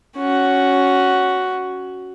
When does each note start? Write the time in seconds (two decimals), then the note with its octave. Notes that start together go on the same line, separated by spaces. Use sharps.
0.17 C#4 F#4